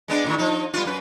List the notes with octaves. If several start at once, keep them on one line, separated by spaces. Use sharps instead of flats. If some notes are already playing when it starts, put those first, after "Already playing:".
G#3 B3 D4
A2 D3 D#3
F3 D#4
G3 B3 F4
F#2 B4